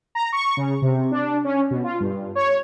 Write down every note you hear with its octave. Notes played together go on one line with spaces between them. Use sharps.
A#5
C#6
C#3
C3
D4
C#4
B2
F4
G2
C#5